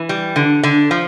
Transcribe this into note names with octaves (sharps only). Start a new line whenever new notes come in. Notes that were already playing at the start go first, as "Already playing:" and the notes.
Already playing: E3
G3
D3
D3
F3